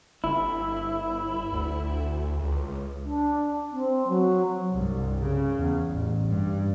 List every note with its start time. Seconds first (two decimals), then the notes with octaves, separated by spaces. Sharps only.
0.24 G1 E4
1.52 D2
2.38 C#2
3.04 D4
3.71 C4
4.08 F#3
4.72 C2 G2
5.21 C#3
5.57 E2
5.92 A1
6.27 G2